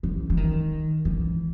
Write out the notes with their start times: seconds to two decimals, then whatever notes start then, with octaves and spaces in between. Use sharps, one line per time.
0.03 E3
0.30 E3
0.37 D#3
1.05 E3